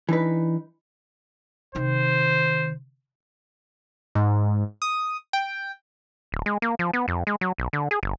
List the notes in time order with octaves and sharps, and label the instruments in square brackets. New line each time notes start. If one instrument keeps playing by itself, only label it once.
[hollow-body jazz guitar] E3 D4 D#4 B4
[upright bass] C3 D#3 [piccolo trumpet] C5
[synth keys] G#2
D#6
G5
[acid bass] D1
G#3
A#3
F3
B3
F2
G#3
F#3
B1
D3
G#4
G1